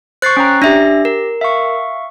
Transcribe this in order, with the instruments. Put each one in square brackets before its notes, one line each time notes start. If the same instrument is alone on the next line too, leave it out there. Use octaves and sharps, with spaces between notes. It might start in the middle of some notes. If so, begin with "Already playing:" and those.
[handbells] C5 C#6 [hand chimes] F#6 A6 C7
[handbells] C#4 G5 A#5
[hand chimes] D4 E5 [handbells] G4 A#6
[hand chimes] A#4
[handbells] E5 F5 C#6